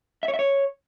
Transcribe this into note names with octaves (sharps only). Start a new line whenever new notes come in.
E5
C#5
E5
C#5